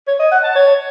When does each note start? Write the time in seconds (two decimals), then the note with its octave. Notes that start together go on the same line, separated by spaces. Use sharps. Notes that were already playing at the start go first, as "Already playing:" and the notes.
0.07 C#5
0.19 D#5
0.31 F#5
0.43 A5
0.55 C#5